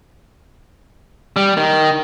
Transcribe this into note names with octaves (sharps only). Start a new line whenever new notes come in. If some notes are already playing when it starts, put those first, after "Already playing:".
G3
D#3